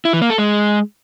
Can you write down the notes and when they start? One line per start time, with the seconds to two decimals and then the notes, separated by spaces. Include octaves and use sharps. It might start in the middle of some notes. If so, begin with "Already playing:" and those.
0.05 E4
0.13 E3
0.22 A#3
0.30 A4
0.38 G#3